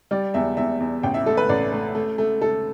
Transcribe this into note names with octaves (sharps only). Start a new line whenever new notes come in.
G3 D5
E2 E5
E2 E5
E2
A1 G5
E5
A3 A4
B4
A1 D5
A3
A3
A3
A3 A4